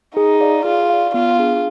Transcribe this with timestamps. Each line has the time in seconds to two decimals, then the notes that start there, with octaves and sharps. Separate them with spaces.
0.16 D#4 G#4
0.41 D5 F5
0.65 F4 G#4
0.90 D5 F5
1.14 B3 F4
1.39 D4 G#4